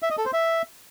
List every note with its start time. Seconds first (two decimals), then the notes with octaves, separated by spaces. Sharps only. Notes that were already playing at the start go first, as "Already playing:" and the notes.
0.02 E5
0.10 D#5
0.18 A4
0.26 C5
0.33 E5